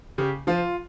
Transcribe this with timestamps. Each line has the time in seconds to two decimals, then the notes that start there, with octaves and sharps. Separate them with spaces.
0.18 C#3 G4
0.47 F3 F4